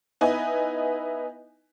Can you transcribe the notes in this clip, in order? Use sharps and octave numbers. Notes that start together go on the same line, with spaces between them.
B3 D#4 E4 B4 D#5 G#5